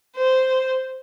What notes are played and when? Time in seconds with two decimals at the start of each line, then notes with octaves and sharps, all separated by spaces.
0.17 C5